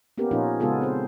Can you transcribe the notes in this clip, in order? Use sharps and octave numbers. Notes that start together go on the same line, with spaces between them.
A#3 B3 C#4 G4 A#4
A#2 F3 C#4 D#4 F4
C#3 G#3 B3 F4 G#4 A4
C4 C5